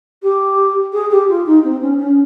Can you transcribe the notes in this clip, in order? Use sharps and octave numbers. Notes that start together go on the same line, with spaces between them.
G4
G#4
G4
F4
D#4
C4
C#4
C#4